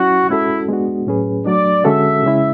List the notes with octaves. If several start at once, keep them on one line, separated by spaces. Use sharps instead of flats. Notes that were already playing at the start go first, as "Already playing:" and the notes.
Already playing: F#3 C#4 E4 F#4
G#3 C#4 E4 F#4 A4
G#3 B3 D4 F#4
A2 F#3 C#4 G#4 B4
F#3 A3 D4 D5
D3 G#3 C#4 F#4 A4 E5
C#3 G#3 C#4 E4